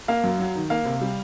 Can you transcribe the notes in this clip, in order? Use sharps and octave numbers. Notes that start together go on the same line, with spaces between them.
A#3 F5
F#2
F#3
D#3
A#3 F5
C3
G3